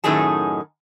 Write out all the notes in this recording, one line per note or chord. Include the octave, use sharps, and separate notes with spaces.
F#2 A2 D#3 D#4 G#4 A5